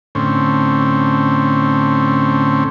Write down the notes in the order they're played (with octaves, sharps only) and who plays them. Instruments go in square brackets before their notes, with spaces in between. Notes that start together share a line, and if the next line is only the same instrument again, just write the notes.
[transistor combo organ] A2 D3 C4 C#4